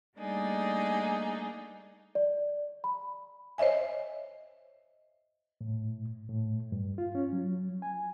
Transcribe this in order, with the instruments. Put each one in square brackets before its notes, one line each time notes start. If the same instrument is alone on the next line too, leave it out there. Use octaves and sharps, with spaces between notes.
[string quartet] G3 A3 A#3 D4 D#4 G#4
[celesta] D5
B5
[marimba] C5 C#5 D#5 E5 G#5
[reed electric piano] A2
A2
G2
F4
C#4
F#3
G#5